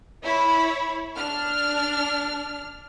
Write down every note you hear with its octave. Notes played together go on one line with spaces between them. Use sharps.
E4 C#5 B5
D4 F6